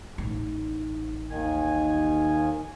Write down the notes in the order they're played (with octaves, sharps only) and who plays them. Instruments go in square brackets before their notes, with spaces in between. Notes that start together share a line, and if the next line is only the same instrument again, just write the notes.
[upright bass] A1 D#4
[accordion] D#2 D#3 G#5